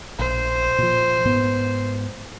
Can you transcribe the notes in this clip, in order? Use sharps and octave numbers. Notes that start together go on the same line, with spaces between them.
A#1 C5
A#2 F3
G#2 B3